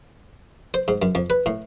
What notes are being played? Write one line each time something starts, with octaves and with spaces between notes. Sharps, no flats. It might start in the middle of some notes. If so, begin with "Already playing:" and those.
C5
G#2
F#2
F2
B4
A2